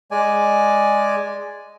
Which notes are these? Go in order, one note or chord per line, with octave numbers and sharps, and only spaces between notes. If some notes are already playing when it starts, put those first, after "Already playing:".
G#3 D5 G#5